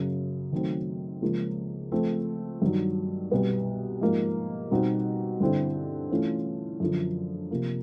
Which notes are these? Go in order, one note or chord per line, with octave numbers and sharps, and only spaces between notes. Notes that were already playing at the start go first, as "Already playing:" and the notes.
Already playing: F#2 C#3 F#3
D#3 F#3 A3 C4
C#2 C#3 F3 A#3
F3 A3 C4
G2 D#3 F#3
C2 B2 G3 B3
G#2 F3 A#3
B2 G3 C4 D#4 F#4
G2 D3 G3 C4 E4
E3 A3 C#4 F4
F#2 D3 F3
C3 F3 A#3